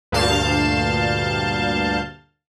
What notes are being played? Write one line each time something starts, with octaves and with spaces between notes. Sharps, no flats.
D2 G2 A#2 F5 A5 G6